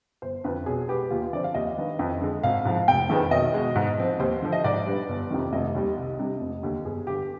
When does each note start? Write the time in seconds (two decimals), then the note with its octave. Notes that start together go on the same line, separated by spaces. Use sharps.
0.22 G1 C5
0.44 F2 D3 B4
0.66 B1 G#4
0.88 B2 G#3 B3 G4
1.10 D#2 F4
1.22 F4
1.33 D3 F3 C4 D5
1.44 F5
1.54 D#2 D#5
1.77 D#3 B3 D4
1.99 F2
2.21 D3 G#3
2.43 G#1 F5
2.65 G#2 F3
2.88 F1 G5
3.10 F2 D#3 G#3 B3
3.31 B1 D#5
3.54 B2 G#3
3.75 G#2
3.98 F3 C4
4.19 D#2 C5
4.42 D3 F3
4.52 D#5
4.64 G#2 D5
4.86 G3 B3 D4
5.09 G1
5.31 F2 C3 D#3
5.53 F1 D#5
5.75 D#2 D#3 G3
5.97 C2
6.19 C3 G3 D4
6.41 F1
6.63 D#2 D3
6.85 G1 G#4
7.07 G2 D3 G4